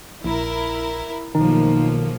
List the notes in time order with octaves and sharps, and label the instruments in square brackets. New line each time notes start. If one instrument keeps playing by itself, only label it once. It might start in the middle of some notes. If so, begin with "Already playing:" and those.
[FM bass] A#1 [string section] E4 A#4
[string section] B1 F3 A#3 [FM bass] D#3 [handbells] D#4